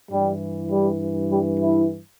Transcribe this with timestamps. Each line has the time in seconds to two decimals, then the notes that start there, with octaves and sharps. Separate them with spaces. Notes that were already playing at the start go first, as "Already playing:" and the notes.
0.11 G2 E3 G3
0.70 G3
1.29 G3
1.58 E4